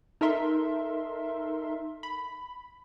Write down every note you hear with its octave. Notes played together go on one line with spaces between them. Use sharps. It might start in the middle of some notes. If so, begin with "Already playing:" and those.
D#4 A4 A#4 E5 C6
B5